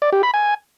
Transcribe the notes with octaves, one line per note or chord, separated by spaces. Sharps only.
D5
G4
B5
G#5